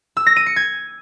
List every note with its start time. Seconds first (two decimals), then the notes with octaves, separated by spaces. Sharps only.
0.17 E6
0.26 A#6
0.36 D#7
0.46 C#7
0.56 G#6